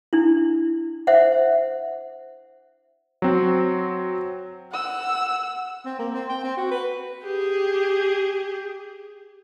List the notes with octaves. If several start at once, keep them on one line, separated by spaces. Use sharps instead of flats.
D4 E4
C5 E5 F#5
F#3 C4
F#5 E6
C4
A#3
C4
G5
C4
F#4
B4
G4 G#4